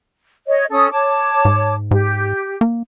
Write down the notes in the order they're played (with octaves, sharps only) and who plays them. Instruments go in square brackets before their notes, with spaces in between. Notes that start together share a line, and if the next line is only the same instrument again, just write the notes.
[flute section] C#5 D#5
C#4 A4 D#6
C#5 A5 D6
[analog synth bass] G#2
[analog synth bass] G#2 [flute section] G4
[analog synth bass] A#3